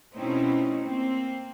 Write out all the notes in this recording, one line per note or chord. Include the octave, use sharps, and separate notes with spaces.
B2 A3 C4 C#4 D#4 E4
A#3 C4